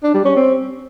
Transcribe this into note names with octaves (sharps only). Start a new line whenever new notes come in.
D4
G3
C#4
C4